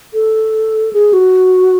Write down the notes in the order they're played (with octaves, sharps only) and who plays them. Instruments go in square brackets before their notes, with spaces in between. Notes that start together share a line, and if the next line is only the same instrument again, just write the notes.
[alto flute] A4
G#4
F#4